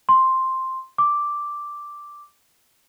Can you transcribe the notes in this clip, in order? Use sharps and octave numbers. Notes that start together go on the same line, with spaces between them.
C6
D6